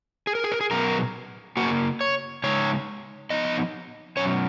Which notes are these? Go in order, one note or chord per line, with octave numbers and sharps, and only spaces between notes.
G#4
A#4
G#4
A#4
G#4
B2 F#3 B3 A#4
C#3 F#3 A#3 F#4
C#5
C#3 G#3 D#4 C#5
F3 B3 D#4 D#5
B2 F#3 C#4 C#5